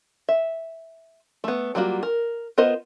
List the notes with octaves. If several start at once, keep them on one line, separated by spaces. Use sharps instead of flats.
E5
A3 B3
F#3 G3 A#3 F4 F#4
A#4
B3 F4 A#4 C5 D#5